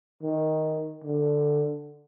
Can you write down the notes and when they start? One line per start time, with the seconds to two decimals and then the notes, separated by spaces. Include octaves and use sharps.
0.22 D#3
1.04 D3